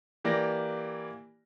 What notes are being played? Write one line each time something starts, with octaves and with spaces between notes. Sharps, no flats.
E3 A#3 G4 D5 A#6